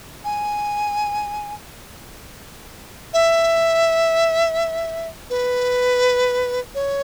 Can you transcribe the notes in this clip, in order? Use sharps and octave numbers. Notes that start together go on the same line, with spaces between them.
G#5
E5
B4
C#5